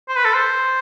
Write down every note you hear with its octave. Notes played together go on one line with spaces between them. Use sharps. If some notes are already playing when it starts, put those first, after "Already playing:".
C5
B4
A4
C5